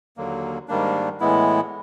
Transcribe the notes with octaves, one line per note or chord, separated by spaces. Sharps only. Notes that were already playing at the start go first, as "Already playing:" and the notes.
D#2 D3 F#3 A#3
G#2 D#3 G3 A#3 D4
A2 E3 G#3 B3 E4